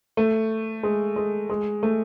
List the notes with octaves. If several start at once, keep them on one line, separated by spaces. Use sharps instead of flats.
A3
G#3
G#3
G#3
A3